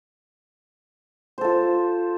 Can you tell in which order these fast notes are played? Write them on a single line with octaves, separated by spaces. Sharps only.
C5 A4 F4